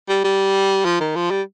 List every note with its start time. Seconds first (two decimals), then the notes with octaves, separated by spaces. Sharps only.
0.09 G3
0.24 G3
0.85 F3
1.00 D#3
1.16 F3
1.30 G3